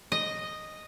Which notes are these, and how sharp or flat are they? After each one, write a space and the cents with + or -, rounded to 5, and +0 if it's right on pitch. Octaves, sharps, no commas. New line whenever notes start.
D#5 -5